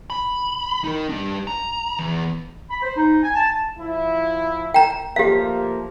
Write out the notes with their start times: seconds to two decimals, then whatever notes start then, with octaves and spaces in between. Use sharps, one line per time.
0.10 B5
0.84 D#4 A#4
1.09 G3 D4
1.47 A#5
1.99 E2
2.71 B5
2.82 C5
2.97 D#4
3.23 G#5
3.36 A5
3.78 F3 E4
4.74 G5 A#5
5.16 F3 A3 A#3 G4 F5